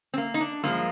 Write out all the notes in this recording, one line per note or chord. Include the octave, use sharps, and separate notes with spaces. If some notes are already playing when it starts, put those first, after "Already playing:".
C4
A#3
D#4
D4
G2 F3 G#3 A#3